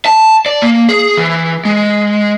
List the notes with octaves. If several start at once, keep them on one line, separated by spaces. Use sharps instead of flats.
A5
D5
A#3
G#4
E3
G#3